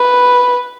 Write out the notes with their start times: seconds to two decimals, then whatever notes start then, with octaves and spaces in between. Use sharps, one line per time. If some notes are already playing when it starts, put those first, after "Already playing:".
Already playing: B4